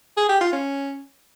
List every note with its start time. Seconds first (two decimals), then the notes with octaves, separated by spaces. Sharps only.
0.17 G#4
0.29 G4
0.41 F4
0.52 C#4